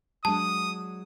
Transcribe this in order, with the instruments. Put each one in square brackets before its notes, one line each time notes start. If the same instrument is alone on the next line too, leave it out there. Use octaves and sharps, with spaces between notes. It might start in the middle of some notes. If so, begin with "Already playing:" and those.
[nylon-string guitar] F#3 G#3 D4 [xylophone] A5 [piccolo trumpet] D#6